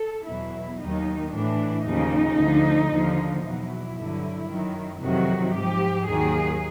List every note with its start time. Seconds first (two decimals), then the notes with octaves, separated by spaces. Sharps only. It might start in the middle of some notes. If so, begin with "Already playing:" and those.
Already playing: A4
0.26 E2 B2 F#3 E4
0.80 D#2 D#3 F#3 D#4
1.32 A2 E3 D4
1.85 D#2 C#3 F3 D#4
2.37 D2 D3 F3
2.90 D#2 D3 F3
3.42 E2 B2 F#3 E4
3.96 G2 D3 F#3
4.48 F#2 D#3 F#3
5.01 F2 C3 D#3 F#3 F#4
5.53 G#2 F3 G4
6.06 D#2 D#3 F#3 G#4